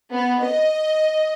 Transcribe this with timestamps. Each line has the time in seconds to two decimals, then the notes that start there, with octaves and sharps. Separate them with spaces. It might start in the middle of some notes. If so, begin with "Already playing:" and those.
0.13 B3
0.42 D#5